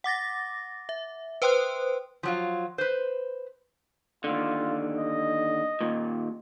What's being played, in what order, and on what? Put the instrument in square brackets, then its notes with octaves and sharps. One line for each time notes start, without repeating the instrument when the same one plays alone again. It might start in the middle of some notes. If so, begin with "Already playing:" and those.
[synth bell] F#5 D6 A6 A#6
E5
B4 C5 G5 C6 D#6 F#6
[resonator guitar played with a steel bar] F3 F#3 F4
B4 C5
[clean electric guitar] D#2 D3 [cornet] F4
[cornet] D#5
[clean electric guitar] D#2 A#2